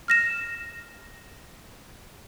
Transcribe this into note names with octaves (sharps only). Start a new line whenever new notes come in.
F6 A#6 E7